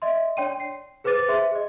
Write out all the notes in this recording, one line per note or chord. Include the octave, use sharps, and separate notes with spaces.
D#5 E5 C6
D4 C#5 D5 G5 C6 D#7
C7
G#4 B4 C5 D6 A6 D#7
G#4 C5 E5 C6
G#4 D#5